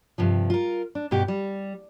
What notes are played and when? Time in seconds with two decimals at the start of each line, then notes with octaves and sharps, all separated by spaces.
0.18 G2 C3 F3
0.50 F4 A#4
0.95 D4
1.11 G2 B2 G4
1.28 G3